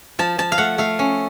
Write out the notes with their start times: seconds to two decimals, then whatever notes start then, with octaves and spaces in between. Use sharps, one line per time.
0.19 F3 A5
0.38 F3 A5
0.52 F5
0.58 A3 F#5
0.78 A3 F5
0.99 C#4